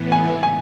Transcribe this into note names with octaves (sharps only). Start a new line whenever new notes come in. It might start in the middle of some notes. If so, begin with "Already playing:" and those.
Already playing: A2 E3 B3
G#5
G#5